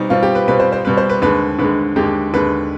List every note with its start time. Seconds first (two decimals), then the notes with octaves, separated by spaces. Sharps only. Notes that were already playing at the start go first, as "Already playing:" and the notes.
Already playing: B2 G3 C4 D#4
0.10 B2 G3 C4 F4
0.23 G4
0.35 B4
0.48 B2 G3 C4 B4
0.60 C5
0.72 C5
0.85 B2 G3 C4 B4
0.97 C5
1.10 B4
1.22 D#2 D3 G#3 B4
1.59 D#2 D3 G#3 B4
1.96 D#2 D3 G#3 G4
2.34 D#2 D3 G#3 B4